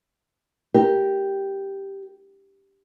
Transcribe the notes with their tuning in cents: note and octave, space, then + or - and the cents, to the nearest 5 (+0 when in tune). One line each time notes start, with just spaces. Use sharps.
G4 +0 A#4 +0